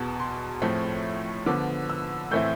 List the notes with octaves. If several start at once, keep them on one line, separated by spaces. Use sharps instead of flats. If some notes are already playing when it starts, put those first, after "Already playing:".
Already playing: E2 B2 B3 A5
C6
A2 F3 A3 C4
D3 F3 B3 D6
E6
A2 E3 A3 C4 E4 G6